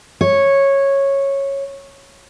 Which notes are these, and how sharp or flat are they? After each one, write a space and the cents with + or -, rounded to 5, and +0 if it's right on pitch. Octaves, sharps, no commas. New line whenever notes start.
C#5 -10